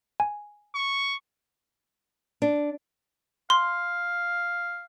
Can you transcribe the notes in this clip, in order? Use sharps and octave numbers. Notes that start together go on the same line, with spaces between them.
G#5
C#6
D4
F5 C6